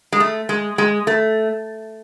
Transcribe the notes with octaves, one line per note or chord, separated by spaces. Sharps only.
G#3
A3
G#3
G#3
A3